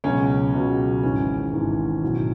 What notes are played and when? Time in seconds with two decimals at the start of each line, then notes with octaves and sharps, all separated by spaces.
0.04 C#2 B2 F#3 C#4
0.54 C#2 B2 F#3
1.03 G#1 G#2 E3 C#4
1.53 G#1 G#2 E3
2.03 B1 A2 F#3